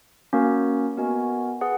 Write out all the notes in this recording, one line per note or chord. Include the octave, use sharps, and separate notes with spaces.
A#3 C#4 F#4 A#4
B3 F#4 A#4 D#5 G#5
G#4 B4 F#5